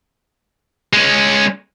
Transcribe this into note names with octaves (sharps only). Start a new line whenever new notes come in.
G#3 C#4